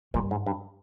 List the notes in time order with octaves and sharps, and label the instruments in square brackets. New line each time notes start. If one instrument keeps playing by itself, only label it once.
[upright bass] G2 [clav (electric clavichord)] A#2
[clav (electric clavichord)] G#2
G2